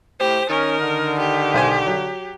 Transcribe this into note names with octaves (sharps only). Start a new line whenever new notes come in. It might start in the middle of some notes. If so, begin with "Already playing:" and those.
A2 G4 C5
D#3 C#4 A#4
D3
G4
B1 C5 G#5
F#3